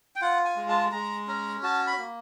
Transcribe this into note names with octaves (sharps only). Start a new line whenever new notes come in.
G5
F4 F#5
G#5
G#3
A5
G#3 A#5
C#4 A#5
F#4 A5
B5
A#3